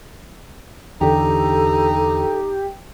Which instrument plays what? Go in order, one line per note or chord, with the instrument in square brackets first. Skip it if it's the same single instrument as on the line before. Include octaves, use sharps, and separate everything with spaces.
[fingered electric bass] E2 D3 [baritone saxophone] D#4 [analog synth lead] G4 [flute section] A4